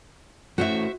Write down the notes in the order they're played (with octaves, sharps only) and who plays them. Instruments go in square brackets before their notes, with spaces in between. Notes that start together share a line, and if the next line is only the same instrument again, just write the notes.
[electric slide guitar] A3 C#4 E4 [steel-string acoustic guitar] F#4 C5 E5